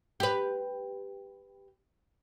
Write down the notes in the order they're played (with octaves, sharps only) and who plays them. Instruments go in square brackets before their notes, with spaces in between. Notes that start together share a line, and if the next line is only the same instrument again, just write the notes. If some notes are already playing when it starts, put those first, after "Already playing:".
[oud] G4 B4